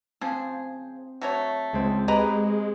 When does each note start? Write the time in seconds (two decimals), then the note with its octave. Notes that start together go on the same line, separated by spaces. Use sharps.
0.21 C#3 F3 C4 G#4
1.22 F#3 A3 C#5
1.73 C#2 G#3 C4
2.08 G#3 G4 B4 D#5 A#5